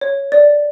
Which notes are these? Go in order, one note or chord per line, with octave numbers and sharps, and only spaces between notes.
C#5
D5